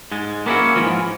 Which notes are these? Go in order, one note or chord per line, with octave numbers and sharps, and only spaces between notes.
G#2 G#3
A#3 B3 C#4 E4 F#4
G#2 E3 F3